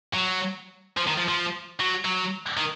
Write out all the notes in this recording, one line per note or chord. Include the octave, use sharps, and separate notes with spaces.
F#3
F3
D#3
F3
F3
F#3
F#3
D#3